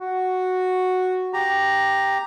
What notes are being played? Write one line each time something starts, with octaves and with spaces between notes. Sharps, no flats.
F#4
G4 A#5